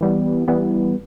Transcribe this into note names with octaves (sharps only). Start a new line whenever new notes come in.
E3 G3 B3
E3 G3 B3